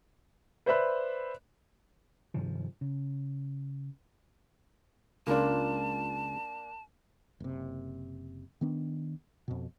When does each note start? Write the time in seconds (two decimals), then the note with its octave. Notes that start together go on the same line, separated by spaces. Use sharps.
0.66 B4 C5 D5 E5 B5 F#6
2.34 G2 C3 D#3 F3
2.81 C#3
5.27 C#2 A#3 D4 F4 A5
7.40 F#1 C3
8.61 D#3 B3 D4
9.48 F2 B2